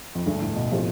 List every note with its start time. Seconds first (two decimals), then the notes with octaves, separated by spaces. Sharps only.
0.15 F2
0.26 D2 G2 D3 A3 D4
0.41 A2
0.56 B2
0.71 A2 F3 C4 G4